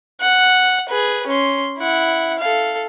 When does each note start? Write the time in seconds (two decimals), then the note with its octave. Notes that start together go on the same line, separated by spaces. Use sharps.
0.21 F#5
0.89 G#4 B4
1.27 C#4 C6
1.78 E4 F#5
2.39 A4 F5